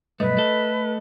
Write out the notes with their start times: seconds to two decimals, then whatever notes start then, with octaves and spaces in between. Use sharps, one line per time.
0.20 B1 G2 A3 B4 D#5
0.37 A3 A4